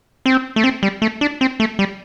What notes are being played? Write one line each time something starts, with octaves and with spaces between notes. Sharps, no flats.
C4
A3
C4
G3
A3
D4
C4
A3
G3